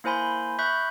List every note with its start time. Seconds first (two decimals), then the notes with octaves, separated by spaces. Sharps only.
0.04 A#3 E4 C5 G#5 B5 C6
0.59 E5 B5 C#6 F#6 G6